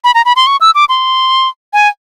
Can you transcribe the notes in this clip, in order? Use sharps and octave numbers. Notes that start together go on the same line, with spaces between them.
B5
A#5
B5
C6
C#6
E6
D6
C6
G#5